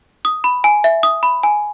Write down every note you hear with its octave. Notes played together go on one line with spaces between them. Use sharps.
D#6
B5
G#5
E5
D#6
B5
G#5